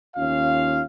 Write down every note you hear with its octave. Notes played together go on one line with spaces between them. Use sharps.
D#2 C#4 F4 F5